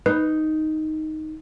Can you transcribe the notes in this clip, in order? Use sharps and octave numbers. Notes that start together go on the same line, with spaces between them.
D#4 B4